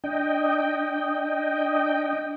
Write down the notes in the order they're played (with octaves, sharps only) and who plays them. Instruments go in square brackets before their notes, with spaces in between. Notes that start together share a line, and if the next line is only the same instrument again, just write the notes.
[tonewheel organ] D4 D#5 G5